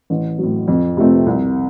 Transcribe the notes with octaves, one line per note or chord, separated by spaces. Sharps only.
A1
A2 F#3
F2
C3 F3 A3 C4
C2